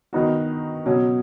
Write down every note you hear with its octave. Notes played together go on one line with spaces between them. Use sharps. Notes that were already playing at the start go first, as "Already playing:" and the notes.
D#3 B3 D#4 F#4
B2 F#3 C#4